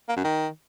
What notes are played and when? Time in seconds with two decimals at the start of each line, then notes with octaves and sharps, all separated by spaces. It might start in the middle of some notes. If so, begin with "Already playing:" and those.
0.09 A#3
0.16 F#2
0.24 D#3